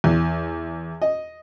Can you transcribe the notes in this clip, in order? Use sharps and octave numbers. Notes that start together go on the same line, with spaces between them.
E2
D#5